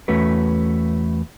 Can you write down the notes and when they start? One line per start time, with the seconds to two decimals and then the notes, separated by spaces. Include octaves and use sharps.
0.08 E2 A3 C#4 F#4 B4